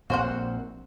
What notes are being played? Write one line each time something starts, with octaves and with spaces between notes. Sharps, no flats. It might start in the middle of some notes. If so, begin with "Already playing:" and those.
A#1 A#3 C4 F#4 C5 F#5